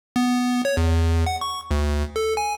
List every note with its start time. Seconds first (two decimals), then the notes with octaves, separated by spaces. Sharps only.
0.16 B3
0.65 C#5
0.77 E2
1.26 F#5
1.41 C#6
1.71 D2
2.16 A4
2.37 G#5